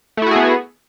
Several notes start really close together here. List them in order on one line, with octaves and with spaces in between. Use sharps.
A3 E4 F#4 G#4 B3